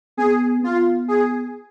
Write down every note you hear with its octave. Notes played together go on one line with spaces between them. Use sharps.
B3 G#4
B3 F4
G#4